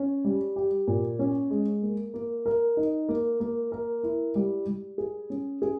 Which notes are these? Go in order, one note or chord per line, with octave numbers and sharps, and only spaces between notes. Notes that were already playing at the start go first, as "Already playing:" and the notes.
Already playing: C#4
G3
G4
A#2
C#4
G#3
A#3
A#3
A#4
D#4
A#3
A#3
A#4
E4
G3
G3
G#4
C#4
G#4